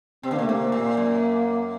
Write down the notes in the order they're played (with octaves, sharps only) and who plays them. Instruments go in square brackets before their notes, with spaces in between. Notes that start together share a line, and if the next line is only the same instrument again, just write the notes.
[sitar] C3 [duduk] C4
[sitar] D3
[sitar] C3 [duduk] A#3
[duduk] A3
[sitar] C3 [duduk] A#3
[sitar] A#2
F#2